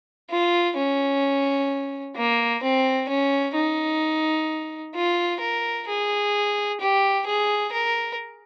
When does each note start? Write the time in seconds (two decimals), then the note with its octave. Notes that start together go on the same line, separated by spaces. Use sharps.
0.30 F4
0.77 C#4
2.16 A#3
2.63 C4
3.09 C#4
3.55 D#4
4.95 F4
5.41 A#4
5.88 G#4
6.81 G4
7.27 G#4
7.72 A#4